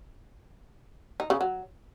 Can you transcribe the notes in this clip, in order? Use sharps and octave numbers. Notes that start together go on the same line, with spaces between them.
D#4
C#3
F#3